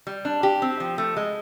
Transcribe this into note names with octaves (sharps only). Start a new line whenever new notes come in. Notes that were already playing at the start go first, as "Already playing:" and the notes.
G3
D4
G4
C4
F3
A3
G#3